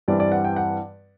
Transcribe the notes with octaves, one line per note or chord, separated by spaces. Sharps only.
G2 E3 G3 C4 D5
D5
F#5
G5
F#5